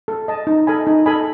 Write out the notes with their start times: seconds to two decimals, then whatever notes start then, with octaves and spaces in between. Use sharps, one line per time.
0.08 A4
0.28 D#5 A5
0.47 D#4
0.67 A4 D#5 G#5 B5
0.87 D#4
1.06 A4 D#5 G#5 B5